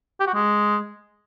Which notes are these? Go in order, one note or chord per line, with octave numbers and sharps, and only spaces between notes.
G4
F#4
G#3